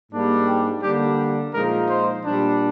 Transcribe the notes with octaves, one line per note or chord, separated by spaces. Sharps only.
G#2 G3 A#3 D4
G4
D3 G3 A#3 D4 G4
A#2 F3 G#3 D#4 A#4
C5
A#2 G3 D4